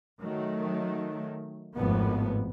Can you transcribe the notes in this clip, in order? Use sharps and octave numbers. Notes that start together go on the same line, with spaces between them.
D#3 F#3 A3
G#1 F2 A2 B3